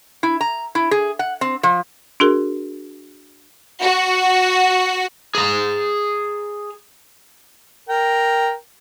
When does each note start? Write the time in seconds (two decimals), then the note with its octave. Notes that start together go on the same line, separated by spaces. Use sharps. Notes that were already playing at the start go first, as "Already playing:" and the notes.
0.23 E4
0.41 A#5
0.75 E4
0.91 G#4
1.19 F#5
1.41 C4
1.63 F3
2.20 D4 F#4 G#4 A#4
3.82 F#4
5.35 G#4 A#5
7.89 A#4 G5